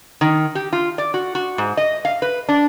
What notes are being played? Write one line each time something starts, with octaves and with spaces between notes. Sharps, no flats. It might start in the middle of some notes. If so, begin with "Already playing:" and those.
D#3
G4
F4
D5
F#4
F#4
G#2
D#5
F5
B4
D4